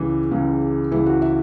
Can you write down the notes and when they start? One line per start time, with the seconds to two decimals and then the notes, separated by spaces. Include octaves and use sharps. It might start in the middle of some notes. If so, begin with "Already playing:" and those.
Already playing: C#2 C#3 E3 G4
0.31 C#2 C#3 E3
0.92 C#2 C#3 E3 E4
1.06 F#4
1.22 E5